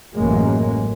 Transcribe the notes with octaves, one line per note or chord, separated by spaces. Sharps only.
A1 F#2 F#3 G#3 A#3